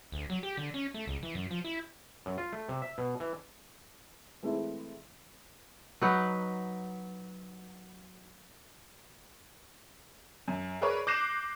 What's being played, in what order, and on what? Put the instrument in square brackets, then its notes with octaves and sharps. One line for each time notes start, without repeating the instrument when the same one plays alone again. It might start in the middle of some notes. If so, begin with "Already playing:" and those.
[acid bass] D2
F#3
G4
D3
C#4
A3
C#2
E3
F#2
F3
E4
[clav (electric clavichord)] F#2
F4
A3
C3
E5
B2
E3
[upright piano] E3 G#3 A3 C4 E4
[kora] F#3 D#4 B4 F#5
[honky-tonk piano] F#2
G#4 A#4 B4 C#5 D5
D6 F#6 G6 A#6 C7 E7